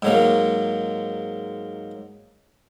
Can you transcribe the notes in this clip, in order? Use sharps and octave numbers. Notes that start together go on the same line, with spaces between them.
G#2 F#3 A#3